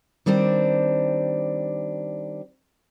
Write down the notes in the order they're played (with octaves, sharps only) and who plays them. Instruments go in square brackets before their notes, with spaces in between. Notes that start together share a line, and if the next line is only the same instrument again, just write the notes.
[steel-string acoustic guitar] D#3 G3 C4 D4